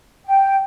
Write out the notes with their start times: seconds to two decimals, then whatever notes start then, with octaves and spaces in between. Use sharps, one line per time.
0.27 G5